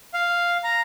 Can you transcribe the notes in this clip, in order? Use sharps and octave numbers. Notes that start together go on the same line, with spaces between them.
F5
A#5